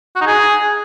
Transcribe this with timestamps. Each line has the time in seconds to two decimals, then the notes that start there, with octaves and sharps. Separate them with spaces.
0.16 F#4
0.21 D#4
0.26 G#4